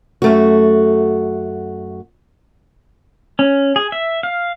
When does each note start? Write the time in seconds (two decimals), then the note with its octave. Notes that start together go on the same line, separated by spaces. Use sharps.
0.22 F#2 A3 F#4
3.39 C#4
3.76 G#4
3.92 E5
4.23 F5